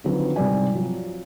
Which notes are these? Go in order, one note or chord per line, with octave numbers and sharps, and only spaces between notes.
D3 D#3 F3 F#3 C4 B4
C2 G#2 G3 C4 D5 G#5
F3 F#3